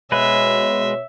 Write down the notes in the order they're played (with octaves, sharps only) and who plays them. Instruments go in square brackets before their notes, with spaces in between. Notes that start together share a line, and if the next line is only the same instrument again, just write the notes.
[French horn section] B2 C#5 [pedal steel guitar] G#3 B4 [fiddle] E5